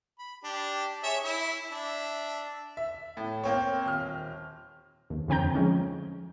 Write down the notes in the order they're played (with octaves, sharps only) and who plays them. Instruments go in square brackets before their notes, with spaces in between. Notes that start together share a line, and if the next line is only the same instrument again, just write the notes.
[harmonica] B5
D4 G4
G#4 C#5 E5
E4 E5
D4 E5
[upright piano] E5
A2
A#3 C4 C#5
D#1 F6
[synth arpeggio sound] D#2
F2 D3 C4 G5 A#5 G6
F3 G#3 C#4